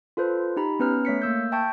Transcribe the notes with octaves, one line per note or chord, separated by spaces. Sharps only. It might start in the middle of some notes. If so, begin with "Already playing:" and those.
F4 A4 B4 C5
D#4 G4 A#5 B5
B3 C#4 B4 A#5 F6
A3 C#5 B6 C#7
A#3 E6 G6
E5 G5 A5 C#6 G6